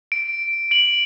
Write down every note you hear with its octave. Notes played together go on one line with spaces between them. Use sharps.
D7
D7 F#7